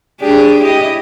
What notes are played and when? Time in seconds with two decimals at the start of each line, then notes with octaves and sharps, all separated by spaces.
0.20 D4 G4 G#4
0.62 E4 G4 D#5